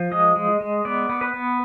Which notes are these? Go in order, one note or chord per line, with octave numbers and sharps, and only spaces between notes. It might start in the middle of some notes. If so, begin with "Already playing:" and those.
Already playing: F3
G#3 D#5
G#3
G#3
B3 D5
B3
B4
B3